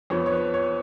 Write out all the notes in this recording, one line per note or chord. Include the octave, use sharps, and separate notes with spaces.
F2 F3 B3 C#5
C#5
B4
C#5